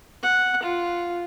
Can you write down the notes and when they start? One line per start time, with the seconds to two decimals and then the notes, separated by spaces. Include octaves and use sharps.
0.23 F#5
0.63 F4